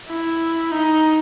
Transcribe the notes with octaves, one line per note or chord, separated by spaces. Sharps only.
E4
D#4